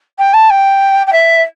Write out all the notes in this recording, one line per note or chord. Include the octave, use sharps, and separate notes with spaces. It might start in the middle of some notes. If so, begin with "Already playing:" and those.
G5
A5
G5
G5
E5